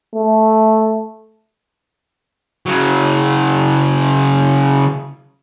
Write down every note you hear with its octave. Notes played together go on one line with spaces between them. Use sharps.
A3
C#3 F#3